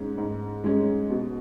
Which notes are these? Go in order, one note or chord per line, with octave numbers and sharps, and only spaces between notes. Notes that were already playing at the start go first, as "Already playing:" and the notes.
Already playing: G#2 G#3 C#4
G#2
G#3 C#4
B2